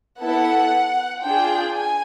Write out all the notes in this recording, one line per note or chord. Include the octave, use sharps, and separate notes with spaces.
B3 E4 A4 F#5
D4 F4 G#4 G5
G#5